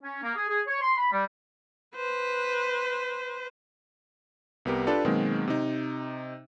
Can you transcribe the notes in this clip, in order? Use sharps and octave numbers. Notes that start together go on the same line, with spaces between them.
C#4
A#3
G#4
G#4
C#5
C6
B5
G3
B4 C5
C2 B3 G4 A#4
D4 F4 G4 A4 B4 D5
B2 D#3 F#3 G#3 A#3 C4
C3 D#4